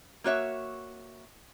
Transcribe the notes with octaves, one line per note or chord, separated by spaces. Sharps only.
A#3 F#4 C#5 E5